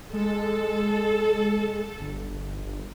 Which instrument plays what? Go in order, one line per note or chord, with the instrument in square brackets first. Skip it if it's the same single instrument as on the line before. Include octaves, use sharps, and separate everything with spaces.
[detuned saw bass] G#3 [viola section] A4
[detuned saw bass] G1